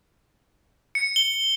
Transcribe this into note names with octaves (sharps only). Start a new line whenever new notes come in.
C#7
G7